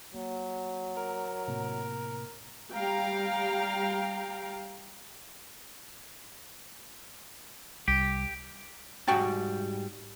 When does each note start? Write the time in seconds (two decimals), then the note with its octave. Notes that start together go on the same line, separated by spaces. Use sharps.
0.14 F#3 A#3
0.97 A#4
1.48 A2 C3 A#3
2.74 G3 F5 G5 A#5
7.88 C2 G3 G4
9.08 G#2 G3 F#4 G5 A5